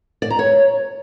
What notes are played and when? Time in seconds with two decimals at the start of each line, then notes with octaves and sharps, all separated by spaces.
0.22 D5
0.30 A#5
0.39 C#5